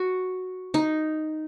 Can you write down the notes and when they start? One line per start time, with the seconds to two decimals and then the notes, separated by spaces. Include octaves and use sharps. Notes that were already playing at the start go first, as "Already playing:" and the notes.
Already playing: F#4
0.74 D#4